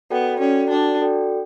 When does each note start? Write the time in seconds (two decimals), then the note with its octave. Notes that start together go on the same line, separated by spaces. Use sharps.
0.10 B3 F#4 A4 D5 G5
0.40 C#4 F#4 A4 D5 G5
0.70 D4 F#4 A4 D5 G5
1.01 F#4 A4 D5 G5